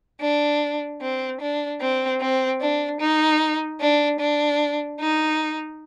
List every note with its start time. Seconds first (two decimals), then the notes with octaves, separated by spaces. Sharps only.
0.21 D4
1.01 C4
1.41 D4
1.81 C4
2.21 C4
2.61 D4
3.00 D#4
3.80 D4
4.20 D4
5.00 D#4